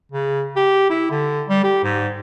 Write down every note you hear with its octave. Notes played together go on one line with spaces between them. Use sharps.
C#3
G4
E4
D3
G3
G4
G#2